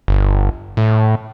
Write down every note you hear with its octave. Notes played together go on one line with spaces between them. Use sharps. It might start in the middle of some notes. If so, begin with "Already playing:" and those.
G1
A2